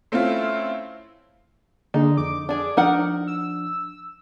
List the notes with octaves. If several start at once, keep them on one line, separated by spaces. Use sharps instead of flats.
A3 C4 C#4 E4 F4
D3 A#3 D#4 G#4
F2 D6
D4 G#4
F3 D4 D#4 A#4 F#5
E6